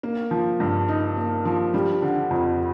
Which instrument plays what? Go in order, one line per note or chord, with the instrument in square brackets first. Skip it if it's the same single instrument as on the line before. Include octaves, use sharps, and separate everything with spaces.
[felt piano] A#3
F3
G2
D#4
A#3
F3
G3
D3
F2